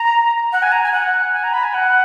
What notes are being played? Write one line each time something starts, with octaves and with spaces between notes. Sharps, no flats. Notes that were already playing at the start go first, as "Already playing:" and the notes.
Already playing: A#5
F#5
G#5
A#5
G#5
F#5
G#5
A#5
B5
G#5
F#5